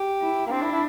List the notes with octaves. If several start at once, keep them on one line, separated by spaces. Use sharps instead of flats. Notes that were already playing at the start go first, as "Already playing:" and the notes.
Already playing: G4
E4
A#3
C4 D4
E4
E4